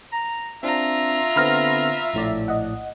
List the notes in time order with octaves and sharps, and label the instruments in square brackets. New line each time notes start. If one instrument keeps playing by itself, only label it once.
[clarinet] A#5
[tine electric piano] C4 D4 [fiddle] F4 A#5 [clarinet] E5
[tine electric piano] D3 B3 C4 [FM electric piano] B5 F6 A#6
[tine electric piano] A#1 A2 D5
[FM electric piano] D#5 F#5